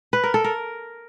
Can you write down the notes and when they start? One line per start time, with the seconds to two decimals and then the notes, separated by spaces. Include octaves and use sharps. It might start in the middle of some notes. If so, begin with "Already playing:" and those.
0.13 B4
0.24 A#4
0.34 A4
0.44 A#4